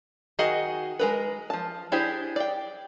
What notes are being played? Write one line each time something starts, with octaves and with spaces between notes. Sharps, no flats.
D#3 F#4 G#4 D#5 F#5
G#3 A#4 B4
F3 A5
D4 E4 G4 G#4 C5
D5 G5